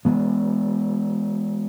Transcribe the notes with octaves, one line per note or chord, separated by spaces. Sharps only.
E3 G#3 B3